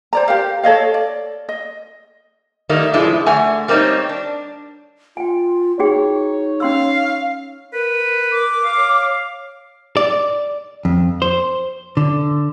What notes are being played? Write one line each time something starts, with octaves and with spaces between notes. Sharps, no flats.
C5 D5 A#5
G4 A#4 F5
A4 C#5 D#5 F5
D5
D#5
D#3 G3 A3 A#3 D#4
A2 C#3 F3 G#3 D4 E4
D3 A3 F#5 G#5
G3 A#3 C4 D4 D#4 C#5
D4
F4 G5 G#5
D#4 F#4 G#4 C#5 G5
C#4 F5 C6 E6
A#4 B4
D6
F5
C#5
D5
F2
C5
D3